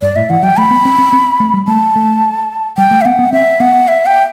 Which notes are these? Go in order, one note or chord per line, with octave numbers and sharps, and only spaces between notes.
G2 D5
A2 E5
E3 F#5
F#3 G5
A3 B5
B3
C4
C4
C4
A3
G3
A3 A5
A3
G3 G5
A3
E5
B3 F#5
B3
C4 E5
B3 F#5
E5
G5